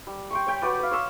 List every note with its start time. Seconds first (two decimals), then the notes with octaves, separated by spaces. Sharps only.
0.07 G3
0.31 G5 C6 C#6
0.47 C#5 G5 B5
0.62 F#4 B4 D5
0.79 B4 F5
0.91 C#5 C6 E6